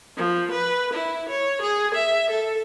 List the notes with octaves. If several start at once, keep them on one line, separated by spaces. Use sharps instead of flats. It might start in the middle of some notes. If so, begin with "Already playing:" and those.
F3
B4
E4
C#5
G#4
E5
A4